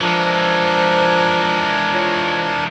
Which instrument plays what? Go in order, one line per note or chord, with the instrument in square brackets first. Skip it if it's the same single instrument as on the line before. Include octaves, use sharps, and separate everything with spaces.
[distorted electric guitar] E3 G#3 [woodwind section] F3 [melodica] D4 A#4
[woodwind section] F3 C#5